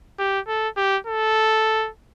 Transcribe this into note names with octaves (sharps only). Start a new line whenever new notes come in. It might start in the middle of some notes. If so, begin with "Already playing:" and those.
G4
A4
G4
A4